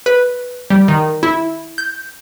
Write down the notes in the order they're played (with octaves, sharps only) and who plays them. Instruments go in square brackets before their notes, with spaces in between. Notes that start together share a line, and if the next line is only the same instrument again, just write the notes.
[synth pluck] B4
G3
D#3
E4
G6